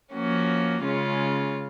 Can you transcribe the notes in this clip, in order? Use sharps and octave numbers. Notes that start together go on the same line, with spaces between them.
F3 A#3 C#4 F#4
C#3 G#3 C#4 F4